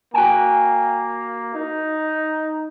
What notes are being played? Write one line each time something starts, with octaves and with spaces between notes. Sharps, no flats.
A#3 F#4 G5 G#5
D#4